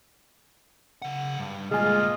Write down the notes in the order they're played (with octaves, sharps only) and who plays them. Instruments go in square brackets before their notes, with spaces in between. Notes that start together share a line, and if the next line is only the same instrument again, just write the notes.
[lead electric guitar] C#3 F#5
G2
[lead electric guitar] D2 A#2 [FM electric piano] G#3 G#5 [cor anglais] F4 [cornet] D#5